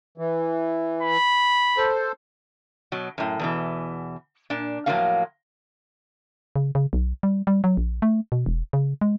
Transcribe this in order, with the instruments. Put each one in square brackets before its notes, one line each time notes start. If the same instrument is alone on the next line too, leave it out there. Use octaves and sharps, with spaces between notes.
[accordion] E3
[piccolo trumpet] B5
[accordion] A4 C5
[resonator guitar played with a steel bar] B2 F#3
F#2 A2
E2 B2 E3
A#2 D4
A2 F3 F#3 A#3 C#4 F5
[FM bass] C#3
C#3
B1
G3
G3
F#3
A#1
A3
B2
E1
C#3
G#3